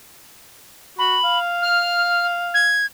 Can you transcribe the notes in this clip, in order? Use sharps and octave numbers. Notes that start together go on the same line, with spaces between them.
F#4 B5
F5
F6
G#6